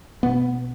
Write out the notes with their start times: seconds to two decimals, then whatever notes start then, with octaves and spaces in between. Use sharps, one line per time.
0.23 B2 B3